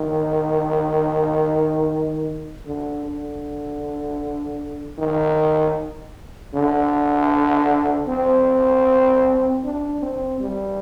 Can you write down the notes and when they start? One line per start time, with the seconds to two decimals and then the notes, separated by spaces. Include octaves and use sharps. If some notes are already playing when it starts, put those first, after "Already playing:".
Already playing: D#3
2.67 D3
3.05 D3
4.99 D#3
6.54 D3
8.08 C4
9.64 D4
10.02 C4
10.40 G3